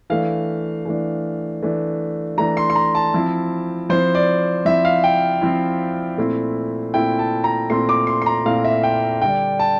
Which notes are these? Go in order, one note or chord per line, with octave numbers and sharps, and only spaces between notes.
E3 A3 D4 F5
E3 A3 D4
E3 A3 D4
E3 A3 D4 A#5
C6
C6
A#5
A5
F3 C4 E4
F3 C4 E4 C5
D5
F3 C4 E4 E5
F5
G5
F3 C4 E4
A#2 A3 C4 E4
A#2 A3 C4 E4 G5
A5
A#5
A#2 A3 C4 E4 C6
D6
C6
C6
A#5
A#2 A3 C4 E4 F5
E5
G5
D3 G3 D4 G5
A5